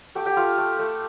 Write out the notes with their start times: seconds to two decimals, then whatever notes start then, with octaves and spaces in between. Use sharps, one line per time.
0.15 A3 G4 G5
0.26 G4 G5
0.36 A3 F4 F5
0.58 A3
0.79 A3